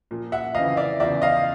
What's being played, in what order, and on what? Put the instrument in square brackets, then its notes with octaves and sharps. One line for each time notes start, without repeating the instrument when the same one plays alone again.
[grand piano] A#2 F3
E5 F#5
F2 C#3 E3 D#5 F5
D5 E5
E2 C#3 F3 D5 E5
D#5 F5